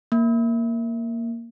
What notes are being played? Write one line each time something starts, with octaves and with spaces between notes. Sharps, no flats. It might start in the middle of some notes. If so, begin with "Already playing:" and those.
A#3